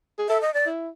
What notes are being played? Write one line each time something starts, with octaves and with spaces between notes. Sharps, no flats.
G#4
A4 E5
D#5
D5
E4